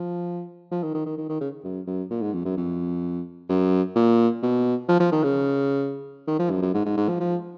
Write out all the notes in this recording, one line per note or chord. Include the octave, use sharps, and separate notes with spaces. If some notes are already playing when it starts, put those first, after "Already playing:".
Already playing: F3
F3
D#3
D#3
D#3
D#3
D#3
C#3
F#2
F#2
A#2
G#2
F2
F#2
F2
F#2
A#2
B2
F3
F3
D#3
C#3
D#3
F3
F#2
F#2
G#2
G#2
G#2
F3
F3